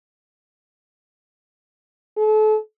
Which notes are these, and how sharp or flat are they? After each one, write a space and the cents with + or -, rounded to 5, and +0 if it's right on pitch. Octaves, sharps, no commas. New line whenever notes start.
A4 -35